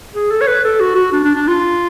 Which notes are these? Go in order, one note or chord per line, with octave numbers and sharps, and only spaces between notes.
G#4
A4
C#5
B4
A4
F#4
F#4
D4
D4
D4
F4